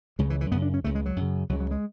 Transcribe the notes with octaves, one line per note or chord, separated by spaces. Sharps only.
C#2 C#3 G#3
E3
E3
F#2 C#3 B3
D4
C#4
C#2 C#3 A3
G#3
F#3
F#2
C#3
C#2 C#3 F#3
F#3
G#3